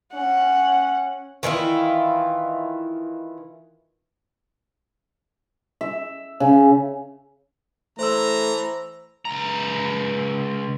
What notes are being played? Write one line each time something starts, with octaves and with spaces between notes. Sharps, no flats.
C#4 F#5
D#3 E3 E4 F4
E5
C#3
E3 A3 C5 A#5 E6
C#2 A#5